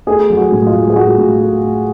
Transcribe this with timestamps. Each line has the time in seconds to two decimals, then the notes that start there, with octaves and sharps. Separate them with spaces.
0.07 A3 G#4
0.30 F#3
0.37 F#4
0.52 A2
0.67 F4
0.74 A2
0.90 G#4
0.96 A2 F#4
1.18 A2
1.40 A3
1.62 A3